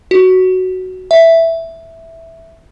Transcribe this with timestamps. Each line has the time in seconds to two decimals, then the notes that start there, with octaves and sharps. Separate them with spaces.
0.11 F#4
1.11 E5